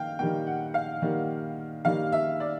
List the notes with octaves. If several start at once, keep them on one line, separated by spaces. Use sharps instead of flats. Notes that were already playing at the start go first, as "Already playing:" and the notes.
Already playing: D#3 A#3 F5 G5
D#3 G3 A#3 G5
F#5
F5
D#3 G3 A#3
D#3 G3 A#3 F5
E5
D5